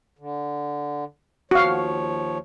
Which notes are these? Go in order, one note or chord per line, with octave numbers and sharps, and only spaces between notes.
D3
D#2 F3 F#4 C#5 F5